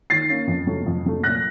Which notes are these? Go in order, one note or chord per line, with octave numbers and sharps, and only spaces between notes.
D#3 A6 C7
A#3 C#4
F2
C3 F#3 A3
F2
C3 F#3 A3
A#2 F#6 A#6